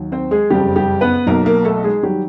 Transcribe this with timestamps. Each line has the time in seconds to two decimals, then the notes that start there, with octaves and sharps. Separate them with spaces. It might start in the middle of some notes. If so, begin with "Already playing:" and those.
Already playing: D#2 D#3 F#3
0.12 C4 C5
0.31 G#3 G#4
0.50 F#1 F2 C#3 G3 G4
0.76 G3 G4
1.01 B3 B4
1.26 B1 B2 F#3 A#3 A#4
1.46 A#3 A#4
1.65 A3 A4
1.84 G#3 G#4
2.03 D#3 F#3 G3 G4